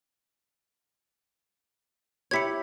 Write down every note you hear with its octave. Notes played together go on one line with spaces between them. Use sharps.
E4 G4 C#5 G#6 B6 C#7